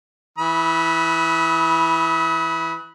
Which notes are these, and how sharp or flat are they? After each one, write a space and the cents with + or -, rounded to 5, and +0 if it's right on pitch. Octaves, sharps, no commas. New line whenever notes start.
E3 +0 B5 -15 D#6 +40